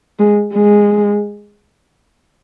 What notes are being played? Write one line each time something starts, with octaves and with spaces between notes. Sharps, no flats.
G#3
G#3